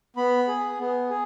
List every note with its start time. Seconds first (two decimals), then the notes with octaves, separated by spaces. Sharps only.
0.16 B3 B5
0.48 G#4
0.79 B3
1.10 G#4